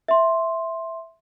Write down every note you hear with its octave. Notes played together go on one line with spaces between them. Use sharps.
E5 C6